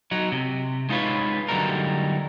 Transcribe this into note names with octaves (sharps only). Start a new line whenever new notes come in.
F#3 D#4
C3
G#3 D#4 F4 A#4 B4 C#5
D3 F#3 G3 A3 D#4 A#4